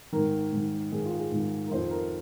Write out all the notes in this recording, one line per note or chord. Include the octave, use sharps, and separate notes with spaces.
G#2 D#3 A#4
G#2 D#3
G#2 D#3 G#4
F4
G#4
G#2 D#3
A#4
F2 D#3 C5
A#4